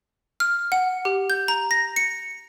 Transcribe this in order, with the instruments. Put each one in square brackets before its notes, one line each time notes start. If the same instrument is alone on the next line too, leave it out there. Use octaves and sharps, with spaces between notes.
[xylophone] F6
F#5
G4
G6
A#5
A#6
C#7